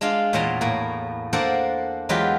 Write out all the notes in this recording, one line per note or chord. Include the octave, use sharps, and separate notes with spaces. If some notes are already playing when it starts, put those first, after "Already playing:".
G#3 D4 F4 F5
E2 A#2 C#5 A5 A#5 C6
A2 A#3
A#3 D4 A4 C5 D5 F#5
E2 F#3 G#3 F4 G4 B4